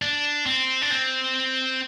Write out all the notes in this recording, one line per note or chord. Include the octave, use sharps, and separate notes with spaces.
D4
C4
D4
C4